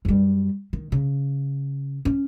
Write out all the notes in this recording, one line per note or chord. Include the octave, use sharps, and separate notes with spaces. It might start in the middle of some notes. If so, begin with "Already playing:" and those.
F#2 G3
D#3
C#3
C#4